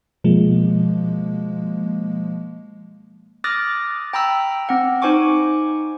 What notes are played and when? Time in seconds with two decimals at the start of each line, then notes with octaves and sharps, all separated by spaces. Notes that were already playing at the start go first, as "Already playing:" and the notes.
0.24 B2 F3 G#3 A#3
3.44 D6 D#6 F6 F#6 A6 A#6
4.13 G5 A#5 B5 E6
4.69 C4 F#5
5.02 D#4 C5 G#5 C#6 D6